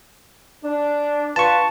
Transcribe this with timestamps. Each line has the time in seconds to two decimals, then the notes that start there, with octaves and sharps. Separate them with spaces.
0.63 D4
1.36 D4 F4 B4 A5 C#6